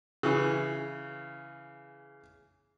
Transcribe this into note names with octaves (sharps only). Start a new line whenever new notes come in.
C#3 E3